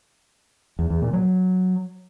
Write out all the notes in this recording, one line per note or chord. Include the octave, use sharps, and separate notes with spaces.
E2
E2
A#2
F#3